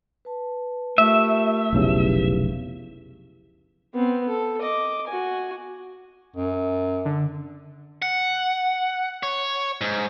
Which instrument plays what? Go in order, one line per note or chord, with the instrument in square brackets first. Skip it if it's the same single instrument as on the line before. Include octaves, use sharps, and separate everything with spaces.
[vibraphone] B4 A5
[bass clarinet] A3 [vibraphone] F4 G4 A#4 [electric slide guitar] E5
[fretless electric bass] F1 B1 C#3 [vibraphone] E4 G4 B4
[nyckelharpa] B3 C4
A4
D#5 D6
F#4 G#5
[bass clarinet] F#2
[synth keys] D3
[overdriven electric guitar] F#5
C#5
G#2